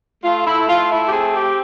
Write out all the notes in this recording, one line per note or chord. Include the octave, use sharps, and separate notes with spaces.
A3 F4
E4
A3 F4
E4
G4
C4 G#4
G4